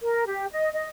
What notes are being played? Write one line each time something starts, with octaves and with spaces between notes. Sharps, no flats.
A#4
G4
D#5
D#5